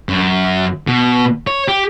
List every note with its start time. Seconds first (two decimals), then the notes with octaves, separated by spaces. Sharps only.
0.09 F#2
0.88 B2
1.47 C#5
1.68 G4